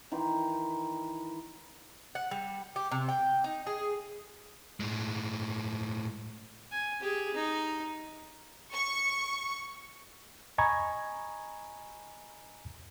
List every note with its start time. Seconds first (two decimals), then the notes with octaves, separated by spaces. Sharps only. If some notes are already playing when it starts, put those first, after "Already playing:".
0.11 D#3 E3 G5 C6
2.15 F#5
2.31 G3
2.76 G4
2.91 C3
3.08 G5
3.44 D#4
3.67 G#4
4.80 A2 G#3
6.71 G#5
7.01 G4 G#4
7.35 D#4
8.73 C#6
10.58 D#5 G#5 A#5 B5 C#6 G#6